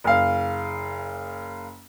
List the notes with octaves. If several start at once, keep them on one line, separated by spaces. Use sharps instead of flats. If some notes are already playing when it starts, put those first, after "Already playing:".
F#1 F5